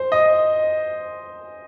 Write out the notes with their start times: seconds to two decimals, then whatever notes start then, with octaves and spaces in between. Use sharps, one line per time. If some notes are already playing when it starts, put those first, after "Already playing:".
Already playing: C5
0.12 D#5